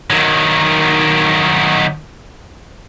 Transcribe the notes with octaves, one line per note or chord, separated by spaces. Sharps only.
D#3 F#3